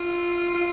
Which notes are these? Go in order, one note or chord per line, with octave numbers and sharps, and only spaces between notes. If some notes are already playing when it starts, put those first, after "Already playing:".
Already playing: F4
F4